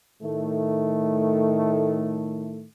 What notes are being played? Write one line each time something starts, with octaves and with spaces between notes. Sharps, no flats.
A2 D#3 A3